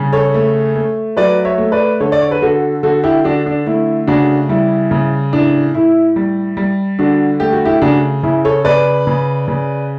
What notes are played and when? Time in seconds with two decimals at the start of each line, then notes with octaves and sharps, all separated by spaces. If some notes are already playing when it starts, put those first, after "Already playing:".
Already playing: C#3 G3
0.13 A4 C#5
0.34 A3
0.76 A3
1.17 F#3 B4 D5
1.45 C#5 E5
1.58 A3
1.72 B4 D5
2.00 D3 A4 C#5
2.12 D5
2.21 C#5
2.31 B4
2.42 D3 F#4 A4
2.83 D3 F#4 A4
3.04 E4 G4
3.24 D3 D4 F#4
3.46 D4
3.66 A3 E4
4.07 C#3 D4 F#4
4.49 G3 E4
4.91 C#3
5.32 A2 D4
5.74 A2 E4
6.16 G3
6.57 G3
6.99 D3 D4 F#4
7.40 A3 G4
7.53 F#4
7.65 E4 G4
7.82 C#3 D4 F#4
8.23 C#3 E4
8.45 A4 C#5
8.65 C#3 B4 D5
9.07 C#3
9.48 C#3